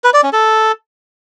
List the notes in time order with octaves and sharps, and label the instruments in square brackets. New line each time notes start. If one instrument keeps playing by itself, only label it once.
[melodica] B4
D5
C#4
A4